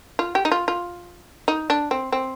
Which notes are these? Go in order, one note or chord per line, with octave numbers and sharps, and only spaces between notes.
F4
G4
D#4
F4
F4
D#4
D4
C4
C4